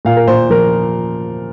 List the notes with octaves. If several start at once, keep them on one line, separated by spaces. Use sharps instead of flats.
A#2 F5
A#4
A#2 C5
F3 A#4